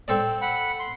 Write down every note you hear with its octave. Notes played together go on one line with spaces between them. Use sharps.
C4 A4 D5
F#5 B5
C6